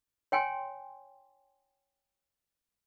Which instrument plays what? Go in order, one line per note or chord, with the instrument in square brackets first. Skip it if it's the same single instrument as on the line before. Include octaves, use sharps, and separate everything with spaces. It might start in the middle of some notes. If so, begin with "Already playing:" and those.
[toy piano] C#5 G5 G#5 C6